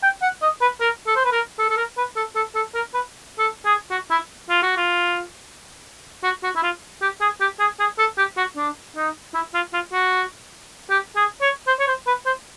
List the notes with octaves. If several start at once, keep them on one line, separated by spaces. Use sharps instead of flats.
G5
F#5
D#5
B4
A#4
A4
C5
B4
A#4
A4
A4
A#4
B4
A4
A4
A4
A#4
B4
A4
G#4
F#4
E4
F4
F#4
F4
F#4
F#4
E4
F4
G4
G#4
G4
G#4
G#4
A4
G4
F#4
D4
D#4
E4
F4
F4
F#4
G4
G#4
C#5
C5
C#5
C5
B4
C5